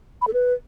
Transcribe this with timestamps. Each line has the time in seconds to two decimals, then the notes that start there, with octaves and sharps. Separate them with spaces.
0.22 B5
0.28 A4
0.33 B4